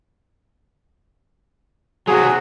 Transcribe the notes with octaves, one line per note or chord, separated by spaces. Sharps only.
C3 F#3 F#4 G#4